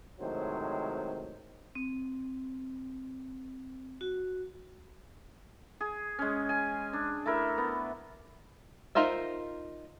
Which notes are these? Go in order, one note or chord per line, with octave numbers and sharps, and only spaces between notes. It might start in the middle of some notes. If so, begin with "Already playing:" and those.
A2 C3 D#3 F#3 G#3 C5
C4
F#4
G#4
G#3 C#4
G#5
D4
A3 E4 A#4 E5
B3
D#4 F4 A#4 C5 E5